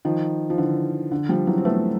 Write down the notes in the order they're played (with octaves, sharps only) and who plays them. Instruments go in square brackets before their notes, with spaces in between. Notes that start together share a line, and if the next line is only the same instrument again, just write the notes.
[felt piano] D#3 F3
F3
D3 E3
D3
F3 G3
E3 F#3
C4
A3 B3